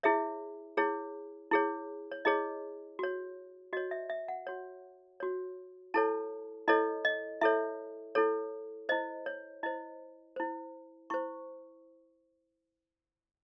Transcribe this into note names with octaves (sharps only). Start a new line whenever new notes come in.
E4 G#4 C#5 E5
E4 G#4 C#5
E4 G#4 C#5
C#5
E4 G#4 C#5 D#5
F#4 C#5
F#4 C#5 D#5
E5
E5
F#5
F#4 C#5
F#4 C#5
E4 A4 C#5 A5
E4 A4 C#5 D#5
D#5
E4 A4 C#5 E5
E4 A4 C#5
E4 C5 D#5
C#5
E4 C5 D#5
E4 C5
E4 C5 C#6